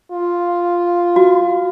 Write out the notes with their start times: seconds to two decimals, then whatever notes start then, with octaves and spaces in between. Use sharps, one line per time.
0.12 F4
1.16 F#4